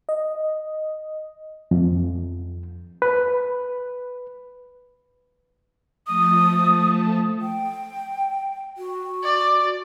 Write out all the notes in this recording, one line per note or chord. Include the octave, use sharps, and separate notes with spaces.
D#5
F2
B4
F3 A3 A5 D#6
G5
F#4
D5